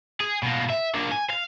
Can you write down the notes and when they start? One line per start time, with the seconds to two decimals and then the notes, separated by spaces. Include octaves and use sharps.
0.21 G#4
0.43 B2 A#3
0.70 E5
0.95 A#3 D4
1.12 G#5
1.30 F5